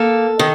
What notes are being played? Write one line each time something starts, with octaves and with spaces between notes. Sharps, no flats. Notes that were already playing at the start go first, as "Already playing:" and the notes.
Already playing: A#3 A4
D#3